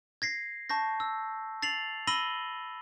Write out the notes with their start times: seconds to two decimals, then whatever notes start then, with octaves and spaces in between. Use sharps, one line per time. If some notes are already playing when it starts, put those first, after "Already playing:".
0.22 G#6 A#6 C7
0.69 A5 C#6 G6 A#6
1.00 E6
1.63 A6 C7 F7 F#7
2.07 B5 E6 A#6 D#7 F#7 G7